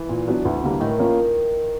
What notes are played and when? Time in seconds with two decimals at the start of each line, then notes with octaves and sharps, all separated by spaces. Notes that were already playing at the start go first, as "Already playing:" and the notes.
Already playing: E3
0.09 A#2
0.27 F#3 B3 D4
0.45 D2
0.64 D3 G3 A#3
0.80 A2 D#3
0.99 F3 A#3 C#4 F4